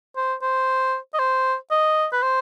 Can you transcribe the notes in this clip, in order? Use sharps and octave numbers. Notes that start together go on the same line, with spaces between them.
C5
C5
D#5
C5
D#5
B4
C5